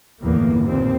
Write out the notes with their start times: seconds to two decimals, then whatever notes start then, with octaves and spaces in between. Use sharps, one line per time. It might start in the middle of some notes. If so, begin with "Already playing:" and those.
0.23 G1 E2 A2 A#3
0.64 D#2 A#2 C4